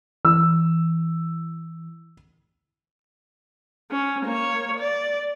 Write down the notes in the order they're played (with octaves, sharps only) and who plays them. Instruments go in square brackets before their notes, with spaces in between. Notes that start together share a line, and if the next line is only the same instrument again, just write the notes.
[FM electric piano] E3 [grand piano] E6
[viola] C#4
A#3 C#5
D5